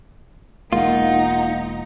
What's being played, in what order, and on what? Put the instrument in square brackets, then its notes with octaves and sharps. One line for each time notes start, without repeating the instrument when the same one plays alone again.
[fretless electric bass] E1 G#3 A#3 [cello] D#4 [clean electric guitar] F4 [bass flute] F#5